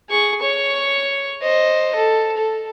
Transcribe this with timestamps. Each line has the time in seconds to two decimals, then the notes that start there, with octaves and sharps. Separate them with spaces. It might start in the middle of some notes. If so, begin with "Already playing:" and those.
0.10 G#4 C#6
0.42 C#5 C#6
1.42 C5 D#5
1.95 A4
2.37 A4